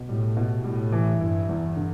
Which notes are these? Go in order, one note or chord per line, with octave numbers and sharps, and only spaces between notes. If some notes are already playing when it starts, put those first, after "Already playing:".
Already playing: B2
A2 G3
B2
A2 G3
E3
G2 E4
E2
D3